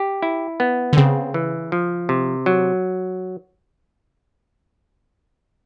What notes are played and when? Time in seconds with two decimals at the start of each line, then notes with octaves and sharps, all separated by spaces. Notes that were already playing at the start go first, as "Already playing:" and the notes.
Already playing: G4
0.22 E4
0.60 B3
0.93 D3
0.97 C#3 C4
1.34 E3
1.72 F3
2.09 C3
2.46 F#3